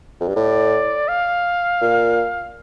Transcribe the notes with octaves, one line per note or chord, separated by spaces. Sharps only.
F2
G2
A2 D5
F5
A#2